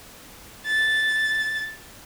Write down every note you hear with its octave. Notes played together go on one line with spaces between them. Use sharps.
A6